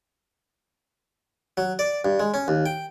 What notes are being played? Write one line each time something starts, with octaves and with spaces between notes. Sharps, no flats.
F#3
D5
G2
G#3
C#4
D#2
G5